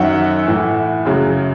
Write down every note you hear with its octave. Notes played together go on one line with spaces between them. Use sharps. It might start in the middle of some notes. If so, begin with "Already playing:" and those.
Already playing: F#2 D#3 F#3 E5 F#5
A2 E3
F#2 C#3 F#3